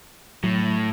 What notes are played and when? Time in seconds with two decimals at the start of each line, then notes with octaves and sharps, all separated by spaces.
0.44 A2 F#3